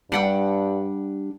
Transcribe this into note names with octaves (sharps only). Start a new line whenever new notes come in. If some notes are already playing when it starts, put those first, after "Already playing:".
G2 G3 D4 F#5 G5